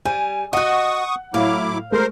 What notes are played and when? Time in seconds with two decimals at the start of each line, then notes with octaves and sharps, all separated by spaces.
0.05 G3 G#5
0.53 F#4 D#5 F#5 C#6 D#6 F#6
1.34 A2 F#3 E4 F5 D6
1.92 G#3 A3 A#4 C5